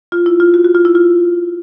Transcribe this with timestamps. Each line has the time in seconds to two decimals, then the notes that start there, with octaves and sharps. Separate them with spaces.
0.12 F4
0.26 E4
0.40 F4
0.54 F#4
0.64 F#4
0.75 F4
0.85 E4
0.95 F4